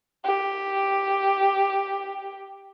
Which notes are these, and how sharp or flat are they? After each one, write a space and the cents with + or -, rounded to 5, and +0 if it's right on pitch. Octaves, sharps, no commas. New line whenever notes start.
G4 +0